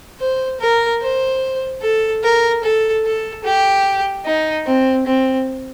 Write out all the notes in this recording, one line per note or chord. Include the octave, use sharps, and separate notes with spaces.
C5
A#4
C5
A4
A#4
A4
A4
G4
D#4
C4
C4